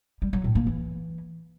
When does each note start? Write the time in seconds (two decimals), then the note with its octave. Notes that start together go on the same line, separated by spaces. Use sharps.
0.22 G3
0.33 F#3
0.44 A2
0.55 A#3
0.67 E3